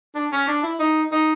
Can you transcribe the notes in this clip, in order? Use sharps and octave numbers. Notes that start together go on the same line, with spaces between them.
D4
C#4
D4
E4
D#4
D#4